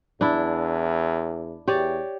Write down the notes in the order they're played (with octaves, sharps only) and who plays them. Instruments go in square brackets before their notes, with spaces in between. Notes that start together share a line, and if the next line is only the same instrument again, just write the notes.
[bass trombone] E2 [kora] D4 E4
[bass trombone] E2 [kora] G4 C#5 D5